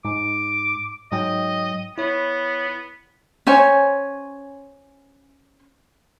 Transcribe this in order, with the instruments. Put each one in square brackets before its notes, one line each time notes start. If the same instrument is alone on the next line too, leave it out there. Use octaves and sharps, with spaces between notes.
[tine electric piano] G#2 [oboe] D6
[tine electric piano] G#2 F#3 G5 [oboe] D#5
[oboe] B3 [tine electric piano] E4 C#5
[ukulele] C#4 C5 C#5 G#5